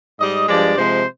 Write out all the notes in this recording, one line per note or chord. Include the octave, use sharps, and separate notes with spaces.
G#2 G3 D#5
G2 F3 G#3 D5
C3 F3 G#3 C5